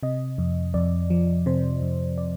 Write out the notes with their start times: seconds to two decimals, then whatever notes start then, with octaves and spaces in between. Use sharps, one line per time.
0.03 C3 D#5
0.38 F2
0.74 F2 D5
1.10 F3
1.46 C3 C5
1.82 F2
2.18 D5